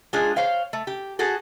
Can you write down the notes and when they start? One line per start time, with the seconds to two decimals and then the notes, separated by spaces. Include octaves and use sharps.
0.13 G#3 D4 F4 G#4
0.36 C5 C#5 F5 G5
0.73 A3
0.87 G4
1.19 F#4 G#4 A4